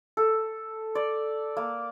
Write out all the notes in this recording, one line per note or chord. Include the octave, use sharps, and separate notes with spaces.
A4
D5
A#3